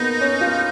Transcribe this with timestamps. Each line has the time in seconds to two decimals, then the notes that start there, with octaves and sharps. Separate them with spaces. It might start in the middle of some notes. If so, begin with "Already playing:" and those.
Already playing: A#3 B3 D#4
0.21 C#4
0.41 F4